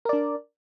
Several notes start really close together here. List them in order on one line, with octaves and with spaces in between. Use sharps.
A#4 D5 D4